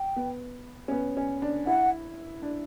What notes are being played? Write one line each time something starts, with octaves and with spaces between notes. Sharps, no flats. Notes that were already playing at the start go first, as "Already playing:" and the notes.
Already playing: G5
B3
C#4
B3
C#4
D4
E4 F#5
D4